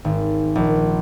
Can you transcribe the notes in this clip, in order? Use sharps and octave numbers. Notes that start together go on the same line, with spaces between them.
G#1
A#1